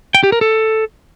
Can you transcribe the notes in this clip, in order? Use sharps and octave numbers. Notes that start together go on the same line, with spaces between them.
G5
G4
A#4
A4